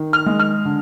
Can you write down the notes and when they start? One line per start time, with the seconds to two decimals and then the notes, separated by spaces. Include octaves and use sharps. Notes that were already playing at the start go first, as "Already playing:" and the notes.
Already playing: D#3
0.13 F6
0.26 G#3
0.39 F6
0.65 D3